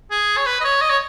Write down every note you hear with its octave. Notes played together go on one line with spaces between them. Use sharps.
G#4
C#5
B4
D#5
C#5
D#5
C#5